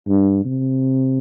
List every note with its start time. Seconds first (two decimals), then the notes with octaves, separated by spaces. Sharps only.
0.08 G2
0.45 C3